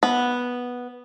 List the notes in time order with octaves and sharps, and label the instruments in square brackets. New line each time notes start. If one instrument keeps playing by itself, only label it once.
[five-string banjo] B3